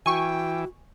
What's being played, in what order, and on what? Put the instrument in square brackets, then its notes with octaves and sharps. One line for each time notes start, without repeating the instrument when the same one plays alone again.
[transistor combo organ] E3 [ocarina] F#4 [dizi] G5 [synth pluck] G#5 C#6